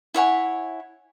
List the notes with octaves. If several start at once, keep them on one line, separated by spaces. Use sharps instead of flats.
E4 C#5 F#5 G#5